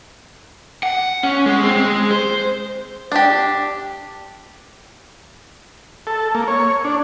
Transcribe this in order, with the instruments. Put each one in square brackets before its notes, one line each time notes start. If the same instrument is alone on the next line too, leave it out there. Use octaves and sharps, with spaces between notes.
[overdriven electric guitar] F#5
C#4
G#3
C4
G#3
C5
[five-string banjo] D4 G4
[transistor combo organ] A4
A#3
C#5
D4